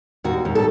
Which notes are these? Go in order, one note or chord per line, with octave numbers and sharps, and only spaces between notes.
D#2 F#4
D#2
A4